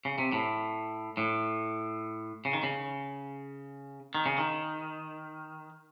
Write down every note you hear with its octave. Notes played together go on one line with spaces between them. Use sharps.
C#3
C3
A2
A2
C#3
D#3
C#3
D#3
C#3
D#3